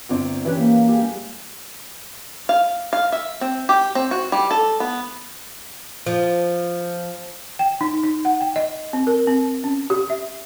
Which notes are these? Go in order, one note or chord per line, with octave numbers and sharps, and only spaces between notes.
G1 C4 D5
E3 C#4 G4 B4
A#3
G4 G#4
G3
F5
F5
E5
C4
G4
C4
F#4
G3
A4
B3
F3
G5
D#4
D#4
F#5
G5
D#5
C4
A#4
C4
C#4
G4
E5